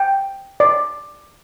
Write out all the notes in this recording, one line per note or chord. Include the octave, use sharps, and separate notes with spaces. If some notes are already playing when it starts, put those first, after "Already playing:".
Already playing: G5
D5